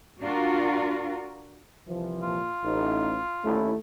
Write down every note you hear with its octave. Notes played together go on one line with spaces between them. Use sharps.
D4 F4 F#4 A#4
C2 E3 F3
A#2 F4
A1 D#4
D#2 A3 C#4 E4